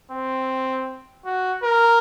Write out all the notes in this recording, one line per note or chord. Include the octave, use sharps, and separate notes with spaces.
C4
F#4
A#4